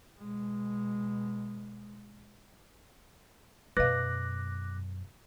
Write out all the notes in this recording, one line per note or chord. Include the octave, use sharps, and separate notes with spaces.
B2 G#3
F#2 B2 B4 D#5 F5 D6 F#6 A#6